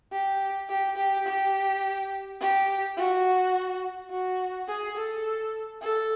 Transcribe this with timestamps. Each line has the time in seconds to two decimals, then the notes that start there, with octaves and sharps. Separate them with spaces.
0.12 G4
0.69 G4
0.97 G4
1.26 G4
2.40 G4
2.97 F#4
4.10 F#4
4.68 G#4
4.96 A4
5.81 A4